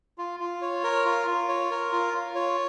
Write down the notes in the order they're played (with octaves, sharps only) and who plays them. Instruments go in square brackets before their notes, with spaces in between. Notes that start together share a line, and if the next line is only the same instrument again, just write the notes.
[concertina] F4
F4
C#5
A#4
F4
F4
C#5
A#4
F4
F4
C#5